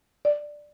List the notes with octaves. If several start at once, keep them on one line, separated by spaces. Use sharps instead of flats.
D5